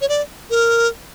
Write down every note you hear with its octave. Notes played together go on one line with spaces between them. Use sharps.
C#5
D5
A#4